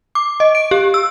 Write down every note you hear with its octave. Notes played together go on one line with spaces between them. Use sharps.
D6
D#5
D7
G4
E6